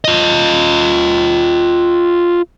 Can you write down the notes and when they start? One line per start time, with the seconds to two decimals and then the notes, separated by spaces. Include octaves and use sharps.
0.05 F4 D#5